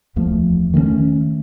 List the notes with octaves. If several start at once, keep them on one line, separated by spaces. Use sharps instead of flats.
D1 E2 F3 A3
D#3 A3 A#3 C#4